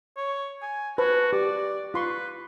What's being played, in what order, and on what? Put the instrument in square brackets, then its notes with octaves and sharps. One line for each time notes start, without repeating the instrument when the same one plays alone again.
[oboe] C#5
G#5
[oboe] F#4 [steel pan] B4 C5 A5
[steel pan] G4 [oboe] D5
[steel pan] F4 C6 C#6 [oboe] B4